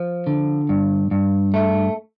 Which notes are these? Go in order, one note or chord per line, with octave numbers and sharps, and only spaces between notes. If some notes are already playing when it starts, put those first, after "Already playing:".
Already playing: F3
D3
G2
G2
A3